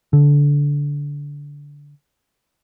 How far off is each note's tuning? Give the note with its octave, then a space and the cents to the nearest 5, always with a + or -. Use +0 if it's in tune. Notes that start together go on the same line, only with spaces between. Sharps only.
D3 -20